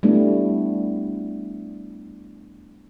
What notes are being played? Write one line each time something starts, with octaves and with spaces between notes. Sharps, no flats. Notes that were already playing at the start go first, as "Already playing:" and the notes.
G3 A3 B3 D4 E4